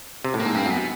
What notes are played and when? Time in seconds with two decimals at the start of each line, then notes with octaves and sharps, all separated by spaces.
0.24 C3
0.34 A2
0.40 A#3
0.45 G#2
0.55 G2 C4
0.66 F#2 B3